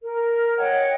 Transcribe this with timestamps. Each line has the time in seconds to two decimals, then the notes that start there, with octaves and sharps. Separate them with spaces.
0.02 A#4
0.57 C#5 D#5 F#5 G5